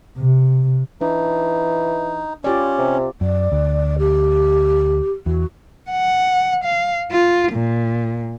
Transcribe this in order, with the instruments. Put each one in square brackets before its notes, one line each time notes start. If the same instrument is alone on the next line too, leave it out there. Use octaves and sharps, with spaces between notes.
[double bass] C3
[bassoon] E3 [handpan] D4 [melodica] D#4
[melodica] C#4 [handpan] F4 G4 D5
[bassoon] C3
[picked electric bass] F#2 [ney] D5
[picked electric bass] D2
[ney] G4
[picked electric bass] E2 [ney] F#4
[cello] F#5
F5
F4
A#2